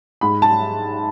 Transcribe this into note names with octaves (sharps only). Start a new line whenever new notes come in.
G#2 B5
A5